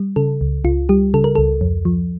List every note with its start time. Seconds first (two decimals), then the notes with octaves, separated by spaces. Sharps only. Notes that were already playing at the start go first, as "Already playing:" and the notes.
Already playing: G3
0.16 C#3 A4
0.41 C#2
0.64 C#2 F4
0.89 G3 G4
1.14 C#3 A4
1.24 A#4
1.35 C#2 A4
1.61 F2
1.85 F3